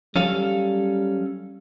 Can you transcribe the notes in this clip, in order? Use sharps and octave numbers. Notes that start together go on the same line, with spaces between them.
F#3 G3 C#4 A4 F5